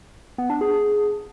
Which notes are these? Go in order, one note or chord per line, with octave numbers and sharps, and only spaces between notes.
B3
D4
G#4